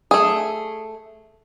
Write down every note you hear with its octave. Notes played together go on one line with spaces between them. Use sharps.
A3 G#4